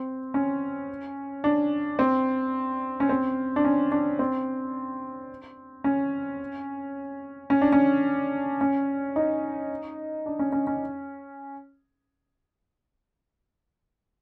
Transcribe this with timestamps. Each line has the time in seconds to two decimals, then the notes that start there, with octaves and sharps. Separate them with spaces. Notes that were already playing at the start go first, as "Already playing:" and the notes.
Already playing: C4
0.34 C#4
1.44 D4
1.99 C4
3.00 C#4
3.09 C4
3.56 D4
3.65 C#4
3.92 D4
4.19 C4
5.84 C#4
7.50 C#4
7.62 D4
7.72 C#4
8.61 C#4
9.16 D#4
10.26 D4
10.39 C#4
10.52 C#4
10.67 C#4